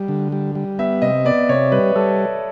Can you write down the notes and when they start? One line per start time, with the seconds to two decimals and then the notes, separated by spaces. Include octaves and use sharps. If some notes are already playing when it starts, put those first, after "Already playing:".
Already playing: G3
0.08 D3
0.32 G3
0.55 G3
0.79 B3 E5
1.02 C3 D#5
1.25 B3 D5
1.49 C3 C#5
1.72 G3 B4
1.95 G3 A4